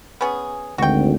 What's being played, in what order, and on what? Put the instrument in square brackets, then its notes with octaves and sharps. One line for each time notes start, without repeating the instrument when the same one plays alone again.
[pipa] B3 C#4 G#4
[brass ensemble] G#1 D2 [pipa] F#4 G5